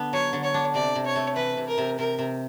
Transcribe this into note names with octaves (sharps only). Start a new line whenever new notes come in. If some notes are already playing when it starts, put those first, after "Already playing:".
Already playing: D3 B3 D4
F#3 C#5
D3
C#5
D4
C3 D5
C3
C#5
A3
E3 B4
C3
A#4
C3
C3 A#4
C3